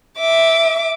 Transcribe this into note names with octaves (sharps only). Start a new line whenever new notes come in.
E5 D6